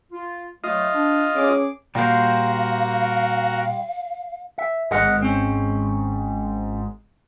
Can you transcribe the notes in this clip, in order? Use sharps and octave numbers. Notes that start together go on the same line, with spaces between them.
F4
F#3 A3 F4 D#5
D4
C#4 G#4 D6
A#2 G3 F#4 A#4 C5 F5
E5
G#1 G#2 A#4 D#5 F#5
C4 C#4